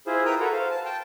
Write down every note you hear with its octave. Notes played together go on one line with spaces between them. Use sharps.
E4 F4 G#4 C5
E4 A#4 B4 G5 A#5 D#6
F#4 A4 B4 A#5
C5 F5
A5
G5 A5